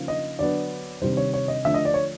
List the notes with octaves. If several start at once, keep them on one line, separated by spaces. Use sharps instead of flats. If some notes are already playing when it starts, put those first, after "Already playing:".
Already playing: C#3 F3 A#3 D#4
D#5
D3 F#3 B3 D4 D5
C3 D#3 G3 C5
C#5
C#5
D#5
D3 F3 A3 D4 E5
D#5
D5
C#5